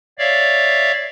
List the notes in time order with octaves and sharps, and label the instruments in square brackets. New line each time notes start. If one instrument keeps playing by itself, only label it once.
[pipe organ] C#5 D5 E5 F5